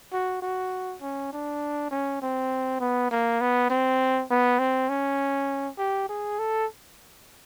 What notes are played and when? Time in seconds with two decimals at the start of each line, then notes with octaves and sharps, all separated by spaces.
0.13 F#4
0.42 F#4
1.02 C#4
1.33 D4
1.91 C#4
2.22 C4
2.80 B3
3.11 A#3
3.41 B3
3.70 C4
4.30 B3
4.59 C4
4.89 C#4
5.78 G4
6.09 G#4
6.39 A4